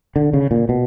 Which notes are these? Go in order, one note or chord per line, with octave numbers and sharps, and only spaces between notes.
D3
C#3
A#2
B2